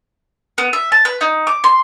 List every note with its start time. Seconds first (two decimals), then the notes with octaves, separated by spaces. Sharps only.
0.58 B3
0.73 E5
0.92 A5
1.05 B4
1.21 D#4
1.47 D6
1.64 C6